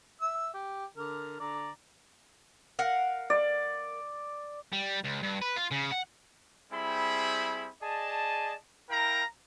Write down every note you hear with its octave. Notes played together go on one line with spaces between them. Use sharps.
E5 E6
G4
D3 A#4
D3 D5 A#5
A#4 F5 F#5
D5
G3
C#2
G2
B4
F4
C#3
F#5
G3 C4 E4 G#4 B5
G#4 D5 D#5 A5
E4 A#4 F5 G5 A#5